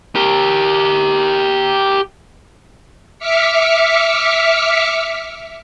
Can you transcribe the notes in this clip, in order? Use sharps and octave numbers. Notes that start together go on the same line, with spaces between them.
G4 A#4
E5 D6 F6 B6 C#7